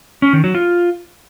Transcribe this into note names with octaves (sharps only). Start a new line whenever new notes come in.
C#4
D#3
F#3
F4